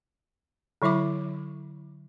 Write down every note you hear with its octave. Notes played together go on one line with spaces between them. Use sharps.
D3 F#3 E4 E5 D6